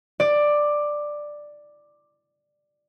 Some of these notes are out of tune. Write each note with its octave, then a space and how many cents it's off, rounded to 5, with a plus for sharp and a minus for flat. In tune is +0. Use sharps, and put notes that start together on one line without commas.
D5 +10